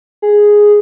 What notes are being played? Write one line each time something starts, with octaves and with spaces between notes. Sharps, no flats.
G#4